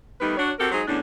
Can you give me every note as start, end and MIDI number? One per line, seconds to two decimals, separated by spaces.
0.21 0.35 51
0.21 0.35 55
0.21 0.35 57
0.21 0.35 59
0.21 0.35 63
0.21 0.35 71
0.37 0.51 62
0.37 0.51 66
0.37 0.51 73
0.59 0.71 60
0.59 0.71 66
0.59 0.71 67
0.59 0.71 69
0.59 0.71 70
0.71 0.82 54
0.71 0.82 56
0.71 0.82 63
0.71 0.82 68
0.71 0.82 72
0.87 0.98 40
0.87 0.98 45
0.87 0.98 61
0.87 0.98 62